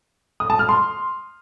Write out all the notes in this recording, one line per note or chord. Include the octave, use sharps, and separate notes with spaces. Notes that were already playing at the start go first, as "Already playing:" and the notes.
D#6
A5
F6
C6